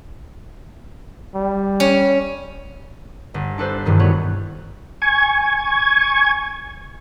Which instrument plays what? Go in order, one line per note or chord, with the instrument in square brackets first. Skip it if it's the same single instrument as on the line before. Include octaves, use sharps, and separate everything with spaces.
[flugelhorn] G3
[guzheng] C#4
[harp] G1
D4 A4 B4 C5
E1 G2 D#3
G3 A3 B3 F#4 C#5
[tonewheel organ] G#5 C#6 G#6